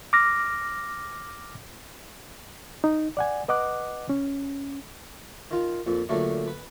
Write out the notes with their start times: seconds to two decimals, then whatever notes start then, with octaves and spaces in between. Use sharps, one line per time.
0.13 D6 F6 A#6
2.84 D#4
3.17 D5 F#5 G#5
3.48 B4 D#5 F#5 D6 F#6
4.09 C#4
5.51 D#3 F4
5.87 F2 A#2
6.09 A#2 D3 F#3 A3 D4
6.48 B4